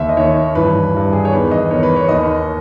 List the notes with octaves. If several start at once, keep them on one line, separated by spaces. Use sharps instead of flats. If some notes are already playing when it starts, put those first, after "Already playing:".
Already playing: D#2 D#3 E5
D#5
D#2 D#3 C#5
G2 E3 B4
G2 E3
G#4
C#5
E2 D#3 B4
D#5
E2 D#3 C#5
B4
C#5
D#2 D#3 D#5